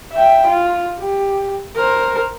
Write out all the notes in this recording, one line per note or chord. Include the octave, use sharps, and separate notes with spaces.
E5 G5
F4
G4
A#4 C5